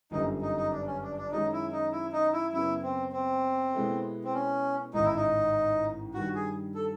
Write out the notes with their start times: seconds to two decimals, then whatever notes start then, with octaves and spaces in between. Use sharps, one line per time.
0.11 G1 F#2 D3 G3 D#4
0.42 D#4
0.57 D#4
0.72 D4
0.87 C#4
1.02 D4
1.17 D4
1.32 F#2 D#3 G#3 C#4 D#4 F#4
1.52 E4
1.72 D#4
1.92 E4
2.13 D#4
2.32 E4
2.52 F#2 C#3 F#3 B3 E4
2.83 C4
3.13 C4
3.73 B2 G#3 B3 E4 A4
4.25 C4
4.33 C#4
4.93 A1 G#2 D#3 D#4
5.05 E4
5.16 D#4
6.14 G2 D#3 G3 F#4
6.35 G#4
6.75 A4